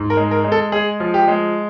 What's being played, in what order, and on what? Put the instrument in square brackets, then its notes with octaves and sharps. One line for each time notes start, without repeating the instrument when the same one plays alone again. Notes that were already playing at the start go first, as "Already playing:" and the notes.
Already playing: [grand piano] G#2
A#4
G#3
A#4
G#3
A4
G#3 G#4
F3
G4
G#3